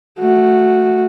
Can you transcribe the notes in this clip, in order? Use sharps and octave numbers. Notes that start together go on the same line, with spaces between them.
A3 F#4